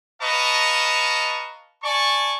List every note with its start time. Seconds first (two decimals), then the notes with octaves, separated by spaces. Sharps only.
0.21 B4 D#5 F5 A5 A#5 C#6
1.83 D5 G#5 A5 C#6